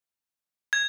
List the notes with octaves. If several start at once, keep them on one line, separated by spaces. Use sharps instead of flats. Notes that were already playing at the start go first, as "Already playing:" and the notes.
G#6